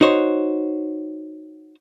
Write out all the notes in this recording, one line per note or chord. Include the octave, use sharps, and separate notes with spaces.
D#4 F#4 C5 C#5